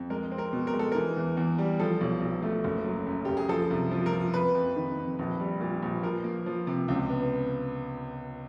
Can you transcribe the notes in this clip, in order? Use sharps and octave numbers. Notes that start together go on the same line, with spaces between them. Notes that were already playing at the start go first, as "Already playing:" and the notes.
Already playing: F2
G#3 A#4
C4
A#4
B2
A#4
G#3
A4
E3 A#4
E2
E2
G3
F3 A4
B1
B1
A3
F#1
F#3
F#2
F#1 G4
G#4
F3 A4
C2
F3
A#4
F3
F2 B4
F2
D#3
F2
A#1
G3
A#2
A#1
F3 A#4
A#3
F3
C3
C#2
B3